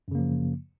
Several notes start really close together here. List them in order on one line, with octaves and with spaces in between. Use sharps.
F#2 C#3 A#3 F3